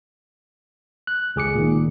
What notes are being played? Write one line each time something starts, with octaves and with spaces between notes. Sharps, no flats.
F#6
C#2 G#4 D6 C#7
A#2 D#3